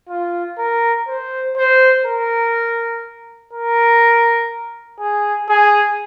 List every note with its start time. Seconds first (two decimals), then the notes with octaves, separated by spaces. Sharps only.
0.09 F4
0.58 A#4
1.08 C5
1.57 C5
2.06 A#4
3.53 A#4
5.00 G#4
5.49 G#4